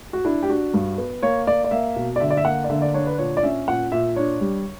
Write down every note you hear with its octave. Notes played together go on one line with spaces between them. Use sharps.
F#4
D4 E4
G4
D4 F#4
G2
B3
A#3 C#5
A#3 D5
D5
A#3 E5
B2
D5
D3 E5
D5
E5
A#3 F#5
D5
D3 E5
D5
D4 C#5
B4
A#2 C#5
D5
C#4 E5
A#2 F#5
A#2 E5
D4 C#5
G3